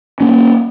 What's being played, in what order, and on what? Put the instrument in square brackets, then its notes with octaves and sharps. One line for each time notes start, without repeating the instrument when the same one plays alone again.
[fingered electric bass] A#3 C#4